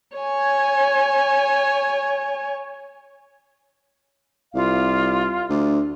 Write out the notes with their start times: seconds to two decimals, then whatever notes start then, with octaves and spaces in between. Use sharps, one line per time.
0.17 C#5 G#5
4.54 C2 F4 F5
5.50 D2